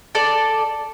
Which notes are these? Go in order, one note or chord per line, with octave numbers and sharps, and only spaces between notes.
A4 D5